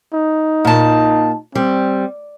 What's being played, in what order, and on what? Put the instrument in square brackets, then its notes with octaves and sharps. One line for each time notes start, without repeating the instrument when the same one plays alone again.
[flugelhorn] D#4
[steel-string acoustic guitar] A#2 A5
[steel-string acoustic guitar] G3 [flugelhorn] C4